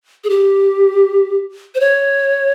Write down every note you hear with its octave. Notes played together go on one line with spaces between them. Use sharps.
G#4
G4
C5
C#5